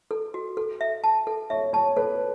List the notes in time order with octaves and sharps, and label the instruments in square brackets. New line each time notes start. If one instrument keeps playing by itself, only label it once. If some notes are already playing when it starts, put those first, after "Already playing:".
[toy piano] A4
F#4
A4
E5
A5
A4
[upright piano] C#5 [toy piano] E5
[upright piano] C#5 [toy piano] A5
[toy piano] A4 [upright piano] B4